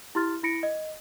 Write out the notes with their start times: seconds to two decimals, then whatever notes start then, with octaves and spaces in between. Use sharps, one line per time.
0.15 E4 G4 C6 F6 A6
0.43 E4 B5 A#6 C#7 D7
0.63 D#5